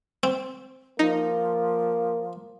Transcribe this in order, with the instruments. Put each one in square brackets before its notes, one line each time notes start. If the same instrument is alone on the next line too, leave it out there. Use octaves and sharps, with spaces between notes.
[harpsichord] C4
[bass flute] F3 [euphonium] A#3 [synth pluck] D#4